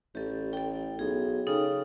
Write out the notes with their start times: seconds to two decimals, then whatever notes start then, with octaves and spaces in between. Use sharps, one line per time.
0.15 A1 G4 A4
0.53 A4 G5
0.99 B1 G#4
1.47 C#3 D#4 A4 G5